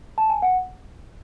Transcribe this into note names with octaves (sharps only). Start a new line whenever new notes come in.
A5
G#5
F#5